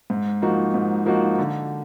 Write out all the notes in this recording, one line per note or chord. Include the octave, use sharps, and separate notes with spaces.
G#2
F3 A#3 D#4 F#4
G#2
F3 A#3 D#4 F#4
D3